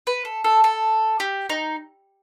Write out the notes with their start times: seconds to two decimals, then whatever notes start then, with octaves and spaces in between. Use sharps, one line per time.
0.07 B4
0.25 A4
0.44 A4
0.64 A4
1.20 G4
1.50 D#4